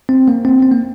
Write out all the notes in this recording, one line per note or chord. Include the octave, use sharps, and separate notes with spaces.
C4
A#3
C4
C4
A#3